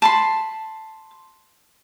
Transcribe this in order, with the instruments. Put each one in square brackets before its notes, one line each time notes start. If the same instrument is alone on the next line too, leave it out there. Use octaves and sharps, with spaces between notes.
[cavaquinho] A5 B5 C6